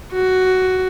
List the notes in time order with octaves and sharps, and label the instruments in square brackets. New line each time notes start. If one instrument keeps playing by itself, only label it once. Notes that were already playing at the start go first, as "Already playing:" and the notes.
[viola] F#4